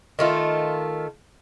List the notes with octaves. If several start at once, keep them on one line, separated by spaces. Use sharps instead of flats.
D#3 A3 F4